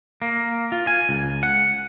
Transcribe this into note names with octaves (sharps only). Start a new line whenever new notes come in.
A#3
F4
G#5
C#2
F#5